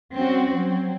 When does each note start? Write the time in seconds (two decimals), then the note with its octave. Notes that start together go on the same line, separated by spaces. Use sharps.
0.15 G3 C4 C#4 F#4
0.50 F#3 C4